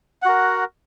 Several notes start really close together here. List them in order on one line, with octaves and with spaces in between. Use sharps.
F#5 F#4 A#4